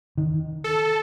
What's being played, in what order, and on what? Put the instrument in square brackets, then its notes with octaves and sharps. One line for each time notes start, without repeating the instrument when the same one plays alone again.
[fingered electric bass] D#3
[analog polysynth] A4